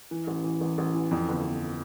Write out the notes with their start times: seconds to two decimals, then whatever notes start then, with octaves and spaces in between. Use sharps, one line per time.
0.11 E3
0.27 A1
0.44 E3
0.61 A1
0.78 A1
0.94 E3
1.11 F2
1.29 G1
1.45 G1